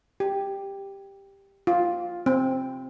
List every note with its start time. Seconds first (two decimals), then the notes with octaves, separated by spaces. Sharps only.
0.20 G4
1.67 F4
2.26 C4